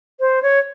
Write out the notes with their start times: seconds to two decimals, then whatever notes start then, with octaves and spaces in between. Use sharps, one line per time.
0.20 C5
0.42 C#5